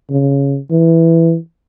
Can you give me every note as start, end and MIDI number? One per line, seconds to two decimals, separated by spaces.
0.10 0.57 49
0.71 1.36 52